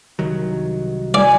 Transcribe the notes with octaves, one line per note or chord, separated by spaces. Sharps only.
C2 D#3 F#3
D5 G#5